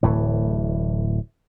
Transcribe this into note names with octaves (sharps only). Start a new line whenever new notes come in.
D1 A2 E3